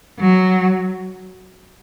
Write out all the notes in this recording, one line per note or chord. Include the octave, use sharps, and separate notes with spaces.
F#3